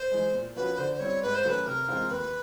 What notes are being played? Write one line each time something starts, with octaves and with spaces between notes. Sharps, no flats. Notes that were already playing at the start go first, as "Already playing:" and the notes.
Already playing: C5
E3 G#3
A#2
F3 A#3 C#4 F#4 B4
D3 C5
C5
G3 C4 E4 C#5
G#2 B4
C5
D#3 F#3 A3 C#4 B4
C3 A#4
E3 G#3 C4 F4
D#2 B4